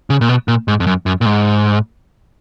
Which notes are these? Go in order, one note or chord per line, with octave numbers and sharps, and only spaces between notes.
C#3
A#2
B2
A#2
G#2
F2
F#2
F#2
A#2
G#2